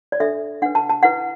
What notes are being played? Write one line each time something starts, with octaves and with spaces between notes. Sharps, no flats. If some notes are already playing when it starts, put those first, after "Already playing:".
D5
D4 A4 E5
D4 B4 F#5
A5
A5
E4 B4 F#5